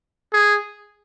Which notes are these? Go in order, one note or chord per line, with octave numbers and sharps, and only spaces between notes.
G#4